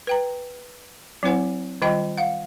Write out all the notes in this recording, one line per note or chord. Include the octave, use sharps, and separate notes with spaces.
B4 G5 A#5
F#3 C4 E4 C5 F#5 G#5
D#3 G3 F4 D#5 G5 A#5
F5 F#5